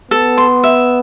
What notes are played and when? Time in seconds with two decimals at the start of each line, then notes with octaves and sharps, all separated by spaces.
0.11 B3 A4
0.38 C6
0.63 E5